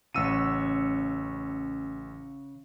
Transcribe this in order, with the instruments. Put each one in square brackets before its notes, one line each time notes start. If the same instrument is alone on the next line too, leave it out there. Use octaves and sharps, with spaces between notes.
[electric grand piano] A1 E6 D#7 [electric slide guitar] C#3 F#4